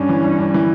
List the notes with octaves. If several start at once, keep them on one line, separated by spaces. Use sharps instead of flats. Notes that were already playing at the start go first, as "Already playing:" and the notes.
Already playing: G2 C#4
E3
G2
G2
E3